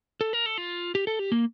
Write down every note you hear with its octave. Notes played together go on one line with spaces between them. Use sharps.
A4
A#4
A4
F4
G4
A4
G4
A#3